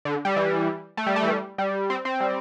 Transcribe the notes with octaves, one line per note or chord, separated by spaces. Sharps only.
D3
G3
E3
A3
G3
A3
E3
G3
G3
C4
C4
G3